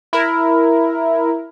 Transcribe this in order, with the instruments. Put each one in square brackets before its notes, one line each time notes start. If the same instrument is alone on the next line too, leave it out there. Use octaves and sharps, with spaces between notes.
[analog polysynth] E4 A#4